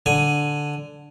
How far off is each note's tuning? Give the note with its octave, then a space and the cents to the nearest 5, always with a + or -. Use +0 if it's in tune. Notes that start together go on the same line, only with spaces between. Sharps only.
D3 +0 G#5 +0